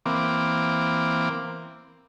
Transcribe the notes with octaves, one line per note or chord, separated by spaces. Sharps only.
E3 A#3 C4 D6